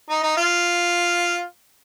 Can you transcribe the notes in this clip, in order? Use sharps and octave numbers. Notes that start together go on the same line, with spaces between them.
D#4
D#4
F4